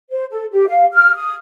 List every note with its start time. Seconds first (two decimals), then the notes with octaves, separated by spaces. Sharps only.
0.11 C5
0.31 A4
0.52 G4
0.68 F5
0.93 F6
1.16 D#6